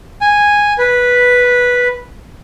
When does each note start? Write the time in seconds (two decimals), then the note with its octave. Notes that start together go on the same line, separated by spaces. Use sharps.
0.21 G#5
0.78 B4